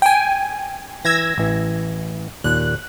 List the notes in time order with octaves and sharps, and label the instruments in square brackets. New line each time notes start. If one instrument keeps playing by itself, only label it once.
[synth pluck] G5 G#5
[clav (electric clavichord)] E3 [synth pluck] E6 G#6 A#6
[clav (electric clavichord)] A1 E3
[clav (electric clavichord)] D#2 A#2 [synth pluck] F#6